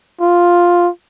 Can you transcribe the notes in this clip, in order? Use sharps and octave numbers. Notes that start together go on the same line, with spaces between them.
F4